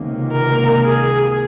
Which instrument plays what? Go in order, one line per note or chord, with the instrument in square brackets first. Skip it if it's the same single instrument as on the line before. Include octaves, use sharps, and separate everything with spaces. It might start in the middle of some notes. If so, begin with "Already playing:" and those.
Already playing: [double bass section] C#2 C3 D#3 A#3
[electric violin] A#4
G#4